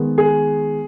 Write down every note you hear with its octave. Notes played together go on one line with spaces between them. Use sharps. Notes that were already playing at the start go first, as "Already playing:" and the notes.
Already playing: D#3 G#3 B3
G#4